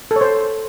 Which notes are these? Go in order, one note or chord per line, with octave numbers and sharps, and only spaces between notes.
A4
C#5
C5